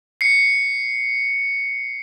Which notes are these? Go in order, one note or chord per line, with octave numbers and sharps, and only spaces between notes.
C7 C#7